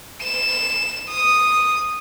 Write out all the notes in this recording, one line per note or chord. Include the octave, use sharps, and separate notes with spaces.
E7
D#6